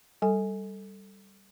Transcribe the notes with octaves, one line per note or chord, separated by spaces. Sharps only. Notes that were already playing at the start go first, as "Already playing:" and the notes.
G3 A4 G#5